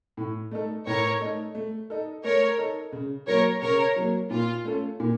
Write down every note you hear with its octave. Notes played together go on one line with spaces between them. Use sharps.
A2
A3 D#4 A4
A2 A#4 C#5
A3 D#4 A4
A3
D#4 A4
A3 A#4 C#5
D#4 A4
C#3
F#3 A#3 A#4 C#5
C#3 A#4 C#5
F#3 A#3
A#2 F4
A3 C#4 A4
A#2